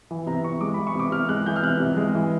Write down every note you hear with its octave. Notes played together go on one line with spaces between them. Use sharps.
E3
C3 A#5
C3 C#6
G#3 D6
E3 B5
C#6
C3 D6
C3 F6
G#3 F#6
E3 G6
F6
C3 F#6
C3
G#3
E3